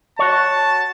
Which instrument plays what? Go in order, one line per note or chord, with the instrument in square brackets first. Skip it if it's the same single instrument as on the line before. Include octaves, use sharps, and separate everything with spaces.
[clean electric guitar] F#4 C#5 [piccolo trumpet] A5